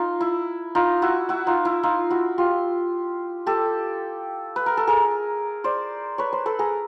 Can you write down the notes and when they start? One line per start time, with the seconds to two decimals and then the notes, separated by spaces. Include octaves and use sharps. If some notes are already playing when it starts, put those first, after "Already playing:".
Already playing: D#4 F4
0.21 E4
0.75 D#4 F4
1.02 E4 F#4
1.29 E4 F#4
1.47 D#4 F4
1.65 E4
1.83 D#4 F4
2.10 E4 F#4
2.38 F4 G4
3.46 G4 A4
4.56 B4
4.66 A#4
4.77 A4
4.87 G#4 A#4
5.64 C5 D5
6.18 B4 C#5
6.33 A#4 C5
6.46 A4 B4
6.59 G#4 A#4